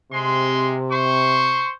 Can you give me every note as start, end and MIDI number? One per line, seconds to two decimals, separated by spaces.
0.12 1.64 48
0.12 0.78 56
0.12 0.78 84
0.90 1.73 72
0.90 1.73 84
0.90 1.73 85